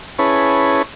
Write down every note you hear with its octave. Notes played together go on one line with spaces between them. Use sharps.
C#4 E4 G#4 B4 C#5 A5